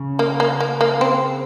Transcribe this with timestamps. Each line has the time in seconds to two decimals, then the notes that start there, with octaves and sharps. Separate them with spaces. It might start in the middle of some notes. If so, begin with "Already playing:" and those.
Already playing: C#3
0.19 A#3
0.40 A#3
0.60 A#3
0.81 A#3
1.01 C4